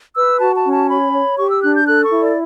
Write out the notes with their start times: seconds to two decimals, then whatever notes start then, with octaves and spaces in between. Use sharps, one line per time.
0.16 B4 E6
0.40 F#4 A5
0.56 A5
0.65 C#4
0.72 A5
0.89 C#5 B5
1.14 C#5
1.38 G4 C#6
1.50 E6
1.62 D4 F#6
1.75 G6
1.87 A4 F#6
2.04 C#6
2.12 E4
2.21 D5